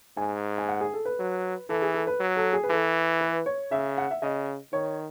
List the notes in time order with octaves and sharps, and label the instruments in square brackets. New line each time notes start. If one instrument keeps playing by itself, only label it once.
[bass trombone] G#2 [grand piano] G#5
[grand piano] G#5
F#5
G#4
A4
B4
[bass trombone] F#3
[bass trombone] E3 [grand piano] A4
[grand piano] G#4
A4
B4
[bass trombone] F#3
[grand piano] A4
G#4
B4
[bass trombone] E3 [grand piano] A4
[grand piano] B4
C#5
[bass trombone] C#3 [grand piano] E5
[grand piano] F#5
E5
[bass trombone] C#3 [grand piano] D#5
[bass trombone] D#3 [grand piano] C#5